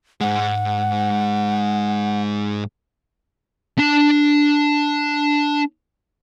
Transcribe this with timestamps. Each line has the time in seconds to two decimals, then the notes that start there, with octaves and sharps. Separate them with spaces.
0.21 G#2 G#3 F#5
3.78 D4 A5